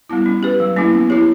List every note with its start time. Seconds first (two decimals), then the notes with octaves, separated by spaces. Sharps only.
0.09 G3 B3 E4
0.26 C#4
0.43 G4 B4
0.60 F#3
0.76 A#3 C#4 E4
0.93 B3
1.10 E4 G4 C#5